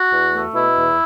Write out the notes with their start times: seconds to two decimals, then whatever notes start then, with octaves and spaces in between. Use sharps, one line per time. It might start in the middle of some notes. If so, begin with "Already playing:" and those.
Already playing: F#4
0.11 E2
0.33 A3
0.55 B2 E4
0.77 E2